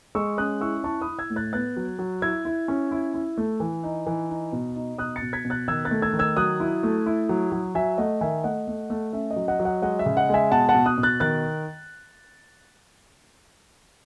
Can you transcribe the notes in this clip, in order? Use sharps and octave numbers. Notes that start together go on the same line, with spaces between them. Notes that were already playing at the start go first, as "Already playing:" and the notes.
G#3 C#6 E6
C#4 D#6 F#6
E4 C#6 E6
E4 A5 C#6
B5 D#6
E4
E6 G#6
A2
F#6 A6
B3 F#6 A6
F#3
F#3
E4 E6 G#6
E4
C#4
E4
E4
A3
E3
D#4
E3
D#4
B2
D#4
B2 D#6 F#6
A6 C#7
B2
G#6 B6
B2
F#6 A6
D#3 E6 G#6
F#6 A6
A3
E6 G#6
D#3
E6 G#6
F#3 D#6 F#6
E4
A3
E4
F#3
F#3
F#3 E5 G#5
A3 D#5 F#5
D#3 E5 G#5
A3 D#5 F#5
A3
A3
C#4 E5
D#5
F#3
D#5 F#5
F#3
D#5 F#5
G#3 D#5 F#5
E5
C#3
D#5 F#5
G#3 E5 G#5
B2 F#5 A5
F#5 A5
B2
D#6 F#6
B2
F#6 A6
D#3 F#6 A6